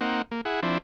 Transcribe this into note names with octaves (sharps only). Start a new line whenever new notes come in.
A#3 C4 D#4 F#5
A#3
E4 G#4 F#5
F3 C4 D4 E4